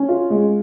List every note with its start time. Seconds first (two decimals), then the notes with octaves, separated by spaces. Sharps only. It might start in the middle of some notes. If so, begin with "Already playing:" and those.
Already playing: C#4
0.09 F4
0.30 G#3